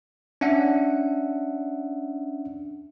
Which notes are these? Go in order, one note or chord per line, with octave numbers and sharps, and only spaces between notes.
C#4 D4 E5 F#5